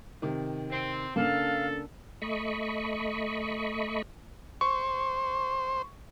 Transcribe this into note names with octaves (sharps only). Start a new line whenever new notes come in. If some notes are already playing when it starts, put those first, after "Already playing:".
C3 D#3
C4
C#3 A#3 D4 A4 F5
A3 D#5 B5 C#6
C5 C#6